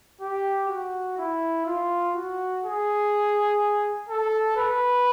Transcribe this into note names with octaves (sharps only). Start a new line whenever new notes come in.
G4
F#4
E4
F4
F#4
G#4
A4
B4